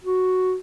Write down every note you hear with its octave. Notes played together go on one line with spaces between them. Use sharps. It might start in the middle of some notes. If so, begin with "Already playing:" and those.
F#4